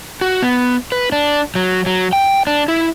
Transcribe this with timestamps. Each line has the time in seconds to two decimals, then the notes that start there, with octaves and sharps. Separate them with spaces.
0.21 F#4
0.42 B3
0.92 B4
1.12 D4
1.55 F#3
1.86 F#3
2.13 G5
2.47 D4
2.68 E4